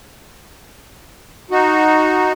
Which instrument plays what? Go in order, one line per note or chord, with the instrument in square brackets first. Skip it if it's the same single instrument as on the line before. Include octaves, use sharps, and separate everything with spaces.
[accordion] D#4 F#4